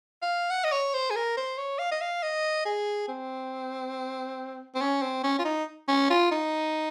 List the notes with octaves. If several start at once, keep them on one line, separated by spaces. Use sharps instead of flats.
F5
F#5
D#5
C#5
C5
G#4
A#4
C5
C#5
F5
D#5
F5
D#5
G#4
C4
C4
C#4
C4
C#4
F4
D#4
C#4
F4
D#4